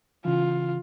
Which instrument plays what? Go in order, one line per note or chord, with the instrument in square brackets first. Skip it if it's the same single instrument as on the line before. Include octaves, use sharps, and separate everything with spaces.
[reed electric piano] C#3 E3 [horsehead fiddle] F4